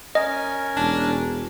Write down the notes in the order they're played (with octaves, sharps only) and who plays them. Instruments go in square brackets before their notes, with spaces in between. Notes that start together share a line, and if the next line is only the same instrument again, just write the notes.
[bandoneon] C#4 A#4 G#5 [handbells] D#5
[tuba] E1 [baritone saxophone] D4